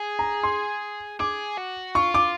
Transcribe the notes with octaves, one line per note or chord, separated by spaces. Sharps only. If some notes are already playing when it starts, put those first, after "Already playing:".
Already playing: G#4
A#5
C6
G#4 D6
F#4
F4 C#6
D6